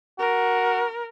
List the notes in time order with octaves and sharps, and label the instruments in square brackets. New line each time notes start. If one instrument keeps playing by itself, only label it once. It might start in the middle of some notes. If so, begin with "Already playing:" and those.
[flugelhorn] F#4 [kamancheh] A#4